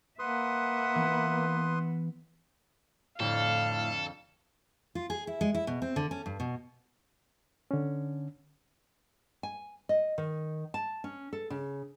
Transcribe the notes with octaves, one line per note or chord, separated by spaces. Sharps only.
A#3 B4 E5 F#5 C6 D#6
E3 B3 E4
F2 A2 D3 A4 F5
F4
G#4
E4
G#3
E4
B2
C4
D3
C#4
G2
B2
D3 C#4
G#5
D#5
D#3
A5
C#4
A4
C#3